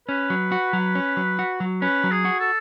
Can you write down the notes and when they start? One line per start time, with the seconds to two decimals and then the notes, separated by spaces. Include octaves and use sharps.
0.08 C#4 B4
0.30 F#3
0.52 F#4
0.73 F#3
0.95 C#4
1.17 F#3
1.39 F#4
1.60 F#3
1.82 C#4 B4
2.04 F#3
2.11 G#4
2.25 F#4
2.40 A4